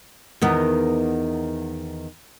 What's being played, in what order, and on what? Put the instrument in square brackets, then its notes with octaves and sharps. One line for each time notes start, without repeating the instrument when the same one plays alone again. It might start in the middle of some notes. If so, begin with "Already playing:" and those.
[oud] E2 D#3 B3